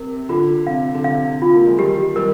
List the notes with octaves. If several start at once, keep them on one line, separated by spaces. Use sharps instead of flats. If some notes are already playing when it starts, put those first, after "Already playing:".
Already playing: C3 A#4
D3 F4
C3 F5
D3
C3 F5
F4
A#3
G#3
D#3 G3 G4
D#3 G3 A#4